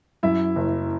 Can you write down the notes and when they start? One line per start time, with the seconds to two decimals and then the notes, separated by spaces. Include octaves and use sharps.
0.23 F#2 E4 E5
0.56 F#1